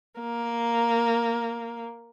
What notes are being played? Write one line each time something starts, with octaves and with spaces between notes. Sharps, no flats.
A#3